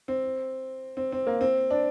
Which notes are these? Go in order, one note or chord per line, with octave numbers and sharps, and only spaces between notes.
C4
C4
C4
A#3
C4
D4